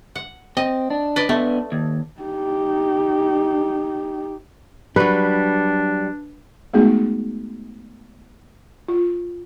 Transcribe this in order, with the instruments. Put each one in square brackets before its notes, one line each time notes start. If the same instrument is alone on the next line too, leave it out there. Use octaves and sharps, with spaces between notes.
[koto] F#5
[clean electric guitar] C4 [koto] D#5
[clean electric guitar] D4
[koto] B4 D5 D#5
[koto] A3 [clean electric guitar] B3 D4
[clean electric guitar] D#2
[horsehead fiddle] D#4 G4
[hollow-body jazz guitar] F#3 G3 [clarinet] D4 [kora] B4
[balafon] G#3 A3 B3 D#4 F#4 G#4
F4